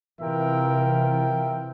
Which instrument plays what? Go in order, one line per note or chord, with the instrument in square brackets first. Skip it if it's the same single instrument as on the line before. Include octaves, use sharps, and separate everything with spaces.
[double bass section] C3 E3 [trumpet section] F4 A#4 E5 G5